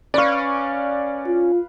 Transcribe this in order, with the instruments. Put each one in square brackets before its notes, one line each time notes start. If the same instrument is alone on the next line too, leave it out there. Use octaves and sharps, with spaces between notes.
[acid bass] C#4 [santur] B4 F5 [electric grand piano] D5 C#6
[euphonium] F4